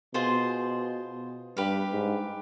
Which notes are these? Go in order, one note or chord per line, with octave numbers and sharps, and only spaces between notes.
B2 F4 G#4 C5
G2 G4 B4 F5
G#2